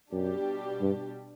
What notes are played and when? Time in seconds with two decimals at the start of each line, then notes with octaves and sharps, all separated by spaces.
0.12 F#2 B2 G3 D4 G4
0.80 G2